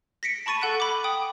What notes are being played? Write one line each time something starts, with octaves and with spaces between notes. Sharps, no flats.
A#6 B6 C#7 D7
A5 B5 C#6 A6 D#7
A4 F#5 F#6 D7
B5 D6
G5 D#6